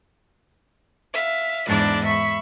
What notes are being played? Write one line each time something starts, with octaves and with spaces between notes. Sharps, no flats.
E5 F5
E2 G#2 D4 E4 D5
E5 B5 C#6